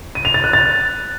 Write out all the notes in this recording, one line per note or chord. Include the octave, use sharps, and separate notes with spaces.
D#7
F7
A6
F#6
A6